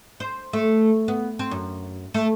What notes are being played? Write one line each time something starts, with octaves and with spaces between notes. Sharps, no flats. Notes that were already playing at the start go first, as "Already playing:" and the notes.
C5
A3
B3
C4
F#2
A3